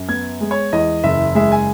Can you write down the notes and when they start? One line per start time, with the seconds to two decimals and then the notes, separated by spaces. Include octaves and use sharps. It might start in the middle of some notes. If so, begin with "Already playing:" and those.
Already playing: F#2
0.09 B3 G#6
0.41 G#3
0.51 C#5
0.73 E2 D#5
1.04 F#1 E5
1.35 G#3 E5
1.52 G#5